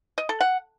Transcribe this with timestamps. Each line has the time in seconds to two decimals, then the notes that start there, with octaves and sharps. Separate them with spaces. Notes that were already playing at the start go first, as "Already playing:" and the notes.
0.18 D#5
0.29 A4
0.41 F#5